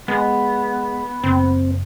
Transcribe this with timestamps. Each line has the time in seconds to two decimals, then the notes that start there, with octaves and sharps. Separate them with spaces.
0.08 G#3 B3
1.23 F#1 C4